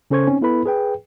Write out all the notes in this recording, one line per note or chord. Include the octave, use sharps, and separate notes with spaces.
C#3 C#4 A4 C5 C#6 G#6
C4 C#4 D#4
B3 E4 A4 B4 B5
G#4 B4 G5